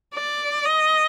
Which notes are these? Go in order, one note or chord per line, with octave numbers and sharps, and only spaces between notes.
D5
D#5